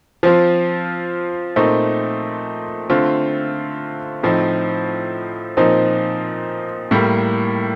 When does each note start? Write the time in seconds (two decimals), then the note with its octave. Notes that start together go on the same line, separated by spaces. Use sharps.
0.23 F3 C4 F4
1.56 A#2 A3 C4 D#4
2.90 D3 A3 C4 F4
4.23 A2 F3 C4 D#4
5.57 A#2 F3 C4 D#4
6.91 A2 G3 A#3